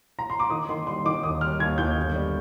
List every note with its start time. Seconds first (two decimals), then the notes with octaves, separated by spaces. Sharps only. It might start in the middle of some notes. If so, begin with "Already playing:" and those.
0.19 A#5
0.30 C6
0.39 D6
0.50 D#3 D#6
0.69 D#3 C6
0.87 G3 C6
1.05 D#3 D6
1.23 D#2 D#6
1.41 G3 F6
1.60 D#2 G#6
1.78 D#2 G6
1.97 G1
2.16 G3